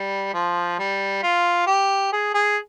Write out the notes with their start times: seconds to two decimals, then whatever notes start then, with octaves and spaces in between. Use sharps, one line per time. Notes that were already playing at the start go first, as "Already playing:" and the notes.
Already playing: G3
0.34 F3
0.79 G3
1.23 F4
1.67 G4
2.12 G#4
2.34 G#4